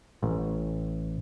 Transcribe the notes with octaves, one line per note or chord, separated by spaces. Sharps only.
A1